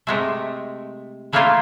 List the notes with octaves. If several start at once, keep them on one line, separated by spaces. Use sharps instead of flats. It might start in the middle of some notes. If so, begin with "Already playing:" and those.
C3 G#3 A3
E3 A3 A#3 C#4 E4 F4